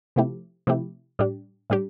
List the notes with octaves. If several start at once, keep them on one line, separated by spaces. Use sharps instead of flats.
C3 F3 A3 E4 G4
C3 F3 A3 E4 G4
A2 G3 D4 G4
A2 G3 D4 G4